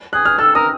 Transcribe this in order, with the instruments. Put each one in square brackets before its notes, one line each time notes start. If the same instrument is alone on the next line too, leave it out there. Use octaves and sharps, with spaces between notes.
[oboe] G#4 [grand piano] F#6
[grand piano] F6
[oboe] A4 [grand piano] E6
[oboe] A#4 [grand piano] D#6